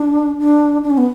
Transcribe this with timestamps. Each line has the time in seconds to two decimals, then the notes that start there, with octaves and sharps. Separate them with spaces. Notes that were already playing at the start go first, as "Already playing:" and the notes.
Already playing: D4
0.40 D4
0.83 D4
0.90 C#4
0.98 B3